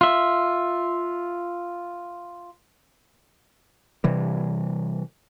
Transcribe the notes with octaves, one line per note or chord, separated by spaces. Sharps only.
F4 E5
C3 E3 G3